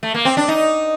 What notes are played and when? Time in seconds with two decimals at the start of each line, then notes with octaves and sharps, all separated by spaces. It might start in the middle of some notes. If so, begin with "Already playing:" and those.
0.03 A3
0.14 A#3
0.25 C4
0.37 D4
0.48 D#4